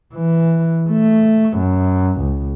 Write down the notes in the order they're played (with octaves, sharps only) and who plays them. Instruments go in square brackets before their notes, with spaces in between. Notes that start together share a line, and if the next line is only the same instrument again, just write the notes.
[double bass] E3
A3
F#2
C#2